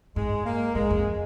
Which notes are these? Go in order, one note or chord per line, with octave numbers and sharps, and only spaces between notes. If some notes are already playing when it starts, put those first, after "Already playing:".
G#2 G#3
A#3
G#2 G#3
F2